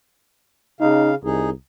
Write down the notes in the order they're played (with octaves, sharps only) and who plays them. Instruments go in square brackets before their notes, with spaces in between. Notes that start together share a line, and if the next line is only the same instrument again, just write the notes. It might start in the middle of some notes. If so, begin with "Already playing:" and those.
[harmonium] C#3 F5 [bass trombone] D#4
[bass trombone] C2 [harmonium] D#4 G#4